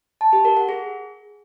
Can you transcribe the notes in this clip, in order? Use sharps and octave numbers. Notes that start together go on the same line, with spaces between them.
A5
G4
A#4
F#5
G#4